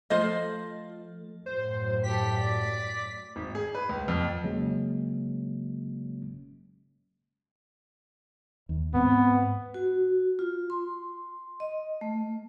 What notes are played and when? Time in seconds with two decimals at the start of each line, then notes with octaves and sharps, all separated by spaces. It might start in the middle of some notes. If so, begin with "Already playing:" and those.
0.10 F3 A3 F4 A4 C5 D#5
1.46 F#2 A2 C5
2.04 G4 A4 B6
2.36 D5
3.36 G#1
3.55 G#4
3.75 B4
3.89 C#2
4.08 F2
4.44 G1 C#3 F#3 G#3 A#3 C#4
8.69 D#2
8.93 G#2 B3 C4
9.74 F#4
10.39 F4
10.70 C6
11.60 D#5
12.01 A3